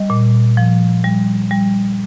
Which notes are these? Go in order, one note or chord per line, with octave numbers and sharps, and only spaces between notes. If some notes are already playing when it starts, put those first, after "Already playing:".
Already playing: G3 D#5
A#2
F3
G3
G3